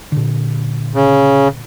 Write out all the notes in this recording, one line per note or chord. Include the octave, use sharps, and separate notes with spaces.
A#2 D3
C#3